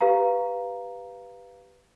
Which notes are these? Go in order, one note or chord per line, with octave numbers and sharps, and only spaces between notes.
G4 B4 F5 A#5